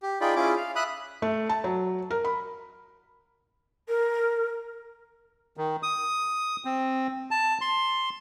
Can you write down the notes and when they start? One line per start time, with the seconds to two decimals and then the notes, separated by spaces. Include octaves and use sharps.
0.03 G4
0.21 D#4 F4 G#4 D5 G5 B5
0.36 C#4 E4 F4 G#4 D6
0.57 F5
0.76 E5 B5 D#6 F#6
1.22 A3
1.49 A5
1.64 F#3
2.11 A#4
2.25 B5
3.88 A#4
5.57 D#3
5.83 D#6
6.65 C4
7.31 A5
7.61 C6